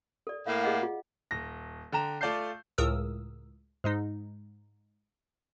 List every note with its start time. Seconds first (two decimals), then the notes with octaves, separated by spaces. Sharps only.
0.27 A4 D5
0.47 A2 A#3 F5
0.63 G#4 D#5 F#5
0.83 F4
1.31 D#1 A#6
1.92 D3 G5 A#5 E7
2.21 A3 F4 D5 A5 G6 C7
2.78 C#2 A2 A#4 D#6 E6
3.84 G#2 G#3 D#4